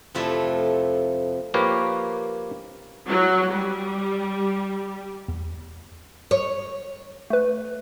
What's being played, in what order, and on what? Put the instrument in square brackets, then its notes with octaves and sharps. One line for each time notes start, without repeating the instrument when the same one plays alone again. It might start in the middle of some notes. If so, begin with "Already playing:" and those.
[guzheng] F2 C3 F3 A3 E4 E5
[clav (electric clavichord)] F3 A#3 G4 A#4 B4 C#5
[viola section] F#3
G3
[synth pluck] E2
[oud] C#5
[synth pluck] A3 B4